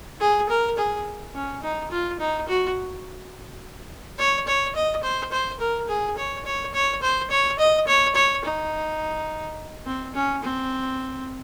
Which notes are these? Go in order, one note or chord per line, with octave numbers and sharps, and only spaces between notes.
G#4
A#4
G#4
C#4
D#4
F4
D#4
F#4
C#5
C#5
D#5
C5
C5
A#4
G#4
C#5
C#5
C#5
C5
C#5
D#5
C#5
C#5
D#4
C4
C#4
C4